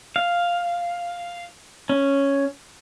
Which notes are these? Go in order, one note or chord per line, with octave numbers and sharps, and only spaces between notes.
F5
C#4